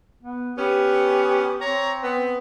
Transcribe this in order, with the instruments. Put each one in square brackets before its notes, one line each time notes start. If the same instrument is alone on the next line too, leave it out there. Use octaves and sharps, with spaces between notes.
[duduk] B3
[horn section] B3 C#4 [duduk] G4
[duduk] C4 [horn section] C#5 A#5
[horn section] B3